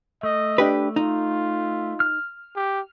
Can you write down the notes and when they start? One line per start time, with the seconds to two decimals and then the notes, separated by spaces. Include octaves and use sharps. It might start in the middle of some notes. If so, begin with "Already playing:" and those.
0.23 A3 D#5
0.58 D4 G4 B4
0.96 D#4 F4
2.00 F6
2.56 G4